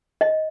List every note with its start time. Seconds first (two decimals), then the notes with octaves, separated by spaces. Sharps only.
0.21 D#5